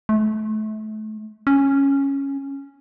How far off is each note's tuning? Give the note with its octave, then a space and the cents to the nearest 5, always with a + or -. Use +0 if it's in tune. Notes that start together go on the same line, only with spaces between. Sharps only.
A3 -30
C#4 -5